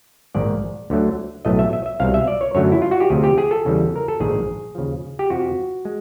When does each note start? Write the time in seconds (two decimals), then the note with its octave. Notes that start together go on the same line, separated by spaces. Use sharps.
0.34 A#1 G#2 D#3 G#3 D5
0.90 D2 D3 F#3 A3
1.45 B1 A2 F#3 A3 D#5
1.59 E5
1.73 E5
1.86 E5
2.00 C2 B2 G3 F5
2.14 E5
2.28 D5
2.41 C#5
2.55 F#2 D3 F#3 A3 C#5
2.72 E4
2.82 F4
2.91 F#4
3.00 G4
3.10 D2 C3 F3 G#4
3.24 G4
3.38 G#4
3.51 A4
3.65 E2 C#3 E3 G3
3.96 A#4
4.08 A4
4.20 A#1 G#2 D#3 G#3 G#4
4.75 D#2 C#3 F3
5.19 G4
5.30 F2 C3 F3 F#4
5.85 G#3